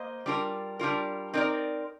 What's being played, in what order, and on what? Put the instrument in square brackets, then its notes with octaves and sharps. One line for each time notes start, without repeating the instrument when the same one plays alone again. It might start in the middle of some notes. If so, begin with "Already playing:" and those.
Already playing: [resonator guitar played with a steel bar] A#3 C5 D#5
G3 D4 F4 A#4
G3 D4 F4 A#4
C4 D#4 A#4 D5